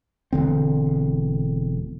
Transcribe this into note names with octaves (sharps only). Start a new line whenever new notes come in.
E1 D3 C4